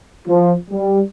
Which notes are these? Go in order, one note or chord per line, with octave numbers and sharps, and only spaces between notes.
F3
G3